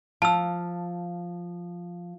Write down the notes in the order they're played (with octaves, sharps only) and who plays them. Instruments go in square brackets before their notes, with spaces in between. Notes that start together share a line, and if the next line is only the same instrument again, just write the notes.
[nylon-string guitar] F3 F5 [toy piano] A5 E6